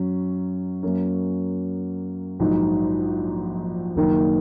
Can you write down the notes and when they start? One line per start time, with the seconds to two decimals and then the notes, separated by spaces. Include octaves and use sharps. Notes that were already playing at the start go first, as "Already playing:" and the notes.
Already playing: F#2 F#3 C#4
0.83 F#2 F#3 A#3 C#4
2.39 A#1 G#2 F#3 D#4
3.96 F#1 F#2 D#3 A#3 D#4